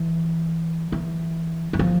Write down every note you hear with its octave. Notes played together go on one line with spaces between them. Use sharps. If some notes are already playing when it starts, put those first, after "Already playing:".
Already playing: E3
E3
E3
F3